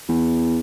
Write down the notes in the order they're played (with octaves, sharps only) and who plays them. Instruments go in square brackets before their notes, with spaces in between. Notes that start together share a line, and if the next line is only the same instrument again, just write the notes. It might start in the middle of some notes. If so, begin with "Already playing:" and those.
[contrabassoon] E2